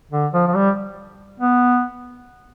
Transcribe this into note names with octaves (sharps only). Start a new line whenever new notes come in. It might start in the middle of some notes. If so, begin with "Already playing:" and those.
D3
F3
F3
G3
B3